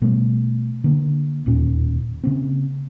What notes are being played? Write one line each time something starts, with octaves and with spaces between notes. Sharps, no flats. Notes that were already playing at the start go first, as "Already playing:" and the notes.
B2 G3 A3
D3 A#3
E1 D#2 A#2 C#4
C#3 A#3 C4